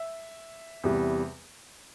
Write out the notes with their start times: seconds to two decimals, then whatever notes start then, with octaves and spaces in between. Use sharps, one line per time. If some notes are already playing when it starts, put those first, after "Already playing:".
Already playing: E5
0.84 E2 C3 G3